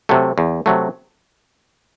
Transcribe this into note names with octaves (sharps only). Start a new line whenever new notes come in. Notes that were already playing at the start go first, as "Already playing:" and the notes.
C3 F#3 A3
E2
C3 F#3 A3